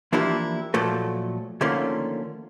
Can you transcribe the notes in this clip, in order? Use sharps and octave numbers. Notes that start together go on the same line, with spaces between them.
E3 F3 A#3 D4 E4 G4
A#2 F3 F#3 A3 A4
D3 D#3 F3 A3 A#3 C#4